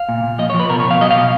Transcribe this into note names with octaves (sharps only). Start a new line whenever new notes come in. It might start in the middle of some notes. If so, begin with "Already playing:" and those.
Already playing: F5
A#2
A#2
F3 D#5
C#5
F3
B4
B2 A#4
B2 C#5
F5
F#3 D#5
F5
B2